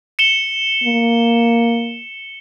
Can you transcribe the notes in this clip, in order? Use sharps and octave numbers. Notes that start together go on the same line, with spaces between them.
C#7 E7 G7
A#3